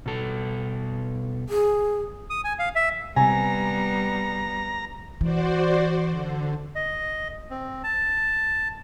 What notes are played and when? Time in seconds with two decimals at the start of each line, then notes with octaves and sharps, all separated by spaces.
0.06 B2 A4
1.49 G#4
2.30 D#6
2.44 G#5
2.59 F5
2.75 E5
3.16 C3 G3 B3 G#5 A#5
5.21 E3 F#4 C5 D5
6.09 D3
6.75 D#5
7.51 C4
7.84 A5